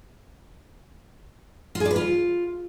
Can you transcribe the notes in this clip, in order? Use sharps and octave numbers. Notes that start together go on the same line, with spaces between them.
F4
G#4
D5
B4
F4